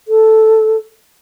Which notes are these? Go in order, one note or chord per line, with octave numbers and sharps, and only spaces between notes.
A4